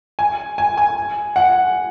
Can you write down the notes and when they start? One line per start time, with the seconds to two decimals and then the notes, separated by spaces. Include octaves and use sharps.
0.19 G#5
0.58 G#5
0.77 G#5
1.36 F#5